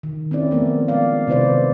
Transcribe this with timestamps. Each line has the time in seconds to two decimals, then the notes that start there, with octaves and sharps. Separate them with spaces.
0.03 D#3
0.31 C4 C#4 E4 D5
0.51 F3 A3 B3 A#4
0.88 G#3 D5 F5
1.27 C3 D#3 E4 B4 C5 D5